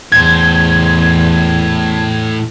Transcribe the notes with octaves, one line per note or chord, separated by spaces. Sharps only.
E2 A2 C5 G#6